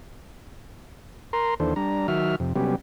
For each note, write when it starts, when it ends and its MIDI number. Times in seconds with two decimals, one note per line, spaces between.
1.33 1.54 70
1.33 1.54 82
1.33 1.54 84
1.60 1.74 39
1.60 1.74 52
1.60 1.74 62
1.60 1.74 69
1.60 1.74 72
1.76 2.07 55
1.76 2.07 62
1.76 2.07 82
2.08 2.36 51
2.08 2.36 54
2.08 2.36 66
2.08 2.36 76
2.08 2.36 89
2.40 2.53 41
2.40 2.53 48
2.56 2.75 48
2.56 2.75 54
2.56 2.75 55
2.56 2.75 59
2.56 2.75 61
2.56 2.75 67